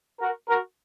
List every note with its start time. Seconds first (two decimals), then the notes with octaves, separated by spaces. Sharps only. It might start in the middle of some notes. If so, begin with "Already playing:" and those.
0.20 F#4 A#4
0.48 F#4 A#4